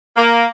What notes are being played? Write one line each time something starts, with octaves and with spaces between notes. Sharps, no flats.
A#3